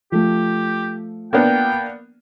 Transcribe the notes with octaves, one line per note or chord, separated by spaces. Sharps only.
F3 A3 G4
A#3 B3 D4 G5